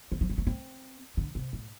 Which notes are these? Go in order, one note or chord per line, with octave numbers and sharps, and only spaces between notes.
D3
F3
G3
A3
C4
D3
C3
A2